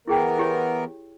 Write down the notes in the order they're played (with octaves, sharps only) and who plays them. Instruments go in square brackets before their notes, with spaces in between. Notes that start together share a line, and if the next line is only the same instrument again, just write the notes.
[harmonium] E3 B3 A#4 [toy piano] E4 G#4 G5
[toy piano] E4 G4 C#5